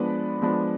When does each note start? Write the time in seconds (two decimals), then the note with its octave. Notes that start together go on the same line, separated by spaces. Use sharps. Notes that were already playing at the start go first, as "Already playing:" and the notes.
Already playing: F3 G#3 B3 D4 B4 D5
0.42 F3 G#3 B3 D4